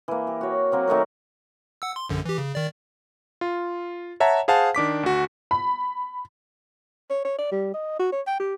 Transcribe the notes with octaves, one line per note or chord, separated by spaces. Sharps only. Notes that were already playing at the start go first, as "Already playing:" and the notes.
E3 A#3
G4
F#4 C#5
F#3 A#3 C4
D#3 A3 F#4 A#4
F#5 E6
C6
A#1 F#2 D3
E3 G4
C#3
D#3 D5
F4
C#5 E5 F#5 A5 A#5
G#4 C5 F5 F#5 A5
D#3 D4 D6 B6
D2 F#4
B5
C#5
C#5
D5
G3
D#5
F#4
C#5
G5
G4